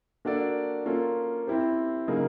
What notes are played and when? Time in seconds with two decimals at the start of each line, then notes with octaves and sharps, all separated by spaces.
0.25 A#3 D4 F#4 A4 D5
0.86 A#3 C#4 F4 A4
1.47 C4 E4 G4 C5
2.08 C#3 F#3 A#3 D#4 G#4